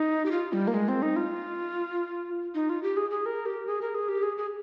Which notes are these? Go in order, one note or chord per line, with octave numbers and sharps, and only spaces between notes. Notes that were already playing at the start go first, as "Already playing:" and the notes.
Already playing: D#4
G4
F4
G3
A#3
G#3
C4
D#4
F4
D#4
F4
G4
G#4
G#4
A#4
G4
G#4
A#4
G#4
G4
G#4
G#4